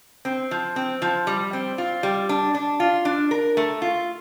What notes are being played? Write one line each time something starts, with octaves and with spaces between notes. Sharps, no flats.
C4
F3
C4
F3
G3
C4
F4
G3
D4
D4
F4
D4
A#4
A3
F4